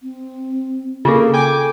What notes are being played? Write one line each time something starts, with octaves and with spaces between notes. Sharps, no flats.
C4
C#3 A#3 F4 G#4 A4
G5 G#5 D6